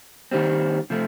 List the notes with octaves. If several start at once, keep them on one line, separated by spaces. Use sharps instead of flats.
D#2 D#3 G3 C4
C3 F3 A3